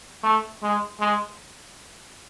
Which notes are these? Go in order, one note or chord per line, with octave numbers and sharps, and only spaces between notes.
A3
G#3
G#3